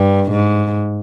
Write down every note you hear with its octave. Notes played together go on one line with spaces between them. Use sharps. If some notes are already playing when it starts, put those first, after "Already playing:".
Already playing: G2
G#2